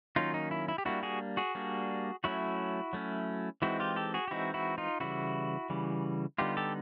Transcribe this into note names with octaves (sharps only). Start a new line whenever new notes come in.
D#3 F#3 A#3 C#4 D#4 F4
D#4
E4
E4
G4
G3 A#3 D4 E4 F#4
F#4 G#4
F#4 G#4
G3 A#3 D4
F#3 A3 C#4 E4 F#4
F#3 A3 C#4
E3 G#3 C4 D#4 E4 F#4
F4 G4
G4 A4
F#4 G#4
G4
E3 G#3 C4 D#4 E4 F#4
E4 F#4
D#4 F4
C#3 E3 G3 E4 F#4
C#3 E3 G3
D3 G3 B3 D#4 F4 G4
G4 A4